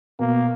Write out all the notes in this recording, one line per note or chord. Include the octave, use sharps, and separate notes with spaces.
B2 A#3